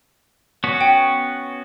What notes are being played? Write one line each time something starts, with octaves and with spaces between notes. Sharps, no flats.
B3 C#4 F#4
G5